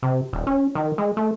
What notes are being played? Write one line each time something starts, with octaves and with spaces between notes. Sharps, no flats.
C3
D#1
C#4
D#3
G#3
A3